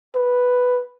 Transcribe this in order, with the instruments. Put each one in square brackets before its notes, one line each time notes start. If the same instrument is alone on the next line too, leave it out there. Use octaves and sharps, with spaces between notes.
[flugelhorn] B4